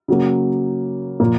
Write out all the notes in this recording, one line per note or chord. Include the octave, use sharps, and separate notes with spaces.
C#3 F#3 A#3
A#2 F3 A#3